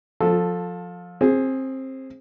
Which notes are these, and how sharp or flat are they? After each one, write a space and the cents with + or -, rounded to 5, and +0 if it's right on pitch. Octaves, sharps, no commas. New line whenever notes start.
F3 +25 A4 +0
C4 +20 G#4 +0